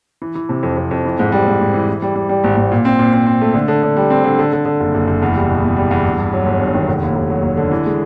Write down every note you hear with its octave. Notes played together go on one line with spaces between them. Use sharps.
E3
E3
C3
F2
F2
F2
E3
G#2
G3
G#2
G#2
E3
E3
G3
G3
G3
G#1
G#1
A#2
C4
A#2
C4
C4
A3
D3
D3
D3
G3
C4
D3
D3
D3
D3
F#1
F#1
F#1
E2
G3
B2
B2
G3
E2
G2
G2
F#3
G1
G2
D#3
F1
D#2
F1
F#3
F1
D3
E3
G#3